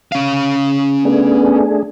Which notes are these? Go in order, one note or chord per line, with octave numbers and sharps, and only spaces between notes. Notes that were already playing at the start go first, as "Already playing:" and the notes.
C#4 F5
A3 B3 D4 G#4